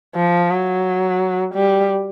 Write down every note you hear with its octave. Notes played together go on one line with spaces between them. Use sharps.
F3
F#3
G3